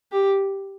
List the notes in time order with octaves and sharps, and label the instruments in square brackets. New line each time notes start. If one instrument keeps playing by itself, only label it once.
[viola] G4